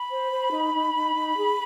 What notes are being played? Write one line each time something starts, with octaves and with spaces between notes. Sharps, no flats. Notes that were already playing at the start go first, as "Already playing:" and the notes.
Already playing: B5
C5
C5
D#4
D#4
D#4
D#4
G#4